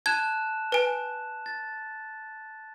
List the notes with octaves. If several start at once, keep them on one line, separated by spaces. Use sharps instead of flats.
A5 F#6 G#6 E7
B4 G#5
A6